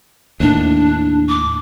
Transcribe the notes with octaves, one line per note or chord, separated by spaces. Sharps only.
D#2 A2 D4
D6